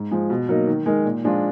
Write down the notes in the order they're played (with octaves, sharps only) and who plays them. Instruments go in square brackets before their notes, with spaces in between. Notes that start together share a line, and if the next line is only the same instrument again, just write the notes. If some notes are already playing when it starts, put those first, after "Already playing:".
Already playing: [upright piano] G#2
F3 G#3
B2
F#3 A#3 D#4
D#3
G#3 D#4 A#4
A#2
F3 G#3 D4 F4